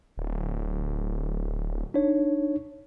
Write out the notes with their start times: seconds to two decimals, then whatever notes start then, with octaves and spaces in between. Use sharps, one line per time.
0.17 D1
1.94 D4 D#4 C#5